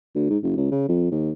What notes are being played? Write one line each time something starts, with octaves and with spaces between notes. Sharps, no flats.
D2
G#2
F#1
C#2
C#3
F2
D#2